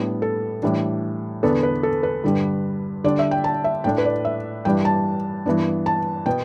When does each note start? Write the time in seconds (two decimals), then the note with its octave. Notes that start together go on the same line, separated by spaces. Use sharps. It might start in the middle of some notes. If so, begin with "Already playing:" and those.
Already playing: A2 G3 B3 D4
0.22 A4
0.63 A2 E3 G3 D4
1.43 E2 D3 B3 D4 A4
1.63 B4
1.83 A4
2.03 B4
2.24 G2 D3 G3 D4
3.04 D3 G3 D4 D5
3.19 E5
3.31 G5
3.44 A5
3.64 E5
3.84 A2 A3 D4 G5
3.98 B4
4.05 D5
4.25 E5
4.65 G2 E3 G3 D4 G5
4.85 A5
5.46 G2 E3 B3 D4
5.86 A5
6.26 B2 B3 G5